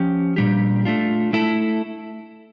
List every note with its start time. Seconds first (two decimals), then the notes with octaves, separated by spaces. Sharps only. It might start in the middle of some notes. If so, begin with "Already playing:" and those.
Already playing: F3 C#4 G4
0.36 A#2 G3 D4 G4
0.85 A3 D4 F4
1.33 A3 E4 A4